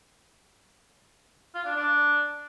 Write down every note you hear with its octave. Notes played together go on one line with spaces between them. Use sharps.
F4
D4
D4